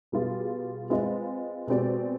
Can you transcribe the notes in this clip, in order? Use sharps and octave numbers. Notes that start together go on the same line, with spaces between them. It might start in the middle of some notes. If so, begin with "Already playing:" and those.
B2 G3 B3 F4 G#4
G#3 C4 F4 B4 D#5
B2 G#3 C4 G4 D5